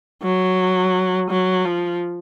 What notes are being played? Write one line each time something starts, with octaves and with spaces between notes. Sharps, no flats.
F#3
F#3
F3